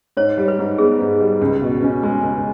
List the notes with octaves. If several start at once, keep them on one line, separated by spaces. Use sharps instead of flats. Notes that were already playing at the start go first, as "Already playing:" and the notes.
G#2 C#5
G3
B4
G#2
B3 G#4
G#2
G3
C#2
B2
C#4
G#3
C#2